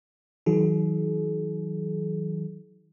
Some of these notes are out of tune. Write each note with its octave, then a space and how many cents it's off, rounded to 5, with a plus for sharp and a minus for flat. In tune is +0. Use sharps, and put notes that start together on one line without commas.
D#3 +45 F#3 +0 G#4 +45